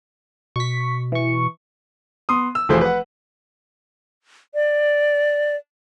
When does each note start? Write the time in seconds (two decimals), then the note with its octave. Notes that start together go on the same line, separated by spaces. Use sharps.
0.56 B2 C#6 B6
1.12 E3 C#6
2.29 B3 C6 D#6
2.55 E6
2.69 F1 E3 F3 A3 G#4 C5
2.81 B4 F#5
4.54 D5